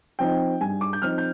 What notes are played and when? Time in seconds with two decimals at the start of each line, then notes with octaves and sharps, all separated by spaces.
0.19 F3 C4 D#4 G5
0.61 G2 G#5
0.81 D6
0.93 G6
1.02 F3 C4 D#4 F6
1.18 G6